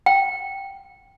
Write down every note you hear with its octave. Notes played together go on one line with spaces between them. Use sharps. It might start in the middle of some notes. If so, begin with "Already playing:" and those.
G5